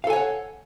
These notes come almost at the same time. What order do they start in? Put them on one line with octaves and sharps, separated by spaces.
F5 A4 G#5 C#5 F#5